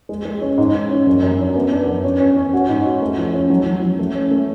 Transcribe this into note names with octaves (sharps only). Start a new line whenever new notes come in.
G#3
G#3
C#4
G#2
G#2
C#4
F#2
F#2
D4
B3
D4
F#2
C#4
C#4
C#4
F#4
G#2
F#4
A3
F3
C#4
F#3
F#3
F#3
A3
C#4
A3